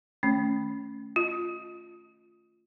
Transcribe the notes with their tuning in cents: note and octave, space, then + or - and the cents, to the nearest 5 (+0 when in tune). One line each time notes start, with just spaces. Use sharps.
D#3 +0 A3 +0 C#4 +0
F4 +0 D#5 +0